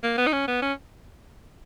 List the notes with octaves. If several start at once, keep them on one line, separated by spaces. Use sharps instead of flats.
A#3
B3
D#4
C#4
B3
C#4